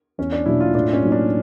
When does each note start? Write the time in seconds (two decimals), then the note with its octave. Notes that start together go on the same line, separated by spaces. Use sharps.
0.18 E2 C#4
0.32 D4
0.46 B2 F#3 A#3 D4 E4
0.60 F4
0.75 A2 D4
0.93 C#4
1.03 F#3 A#3 D#4
1.12 D4